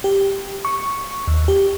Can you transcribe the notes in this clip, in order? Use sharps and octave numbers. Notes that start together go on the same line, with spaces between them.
G4
C#6
D#2
G4